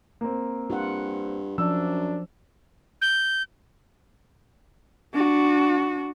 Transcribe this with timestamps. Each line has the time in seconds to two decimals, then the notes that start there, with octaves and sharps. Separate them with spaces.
0.21 A#3 C4
0.70 G2 F4 F#5
1.58 F#2 F3 D4 E6
3.02 G6
5.14 D4 F#4